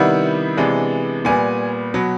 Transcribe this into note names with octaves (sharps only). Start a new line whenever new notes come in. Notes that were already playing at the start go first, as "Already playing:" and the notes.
Already playing: C3 D#3 G3 B3 E4 F#5
C3 E3 G#3 B3 D4
A#2 G3 B3 G#5
B2 F#3